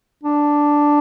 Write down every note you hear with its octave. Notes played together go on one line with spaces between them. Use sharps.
D4